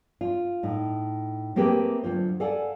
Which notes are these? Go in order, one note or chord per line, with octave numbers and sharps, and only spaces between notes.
F4
A2 D#4
A3 A#3 C4 G4 G#4 B4
D2 F#3 F4 C5
A4 D5 F5 F#5 G#5